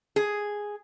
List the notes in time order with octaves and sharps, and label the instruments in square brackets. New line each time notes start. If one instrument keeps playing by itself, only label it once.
[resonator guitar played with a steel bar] G#4